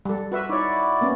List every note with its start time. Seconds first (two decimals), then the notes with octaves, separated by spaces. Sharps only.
0.05 G3 A4
0.32 F#4 B4 E5
0.49 D#4 E4 F#4 C#5 D5
1.01 A#3 B3 C#4